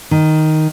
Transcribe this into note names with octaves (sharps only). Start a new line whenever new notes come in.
D#3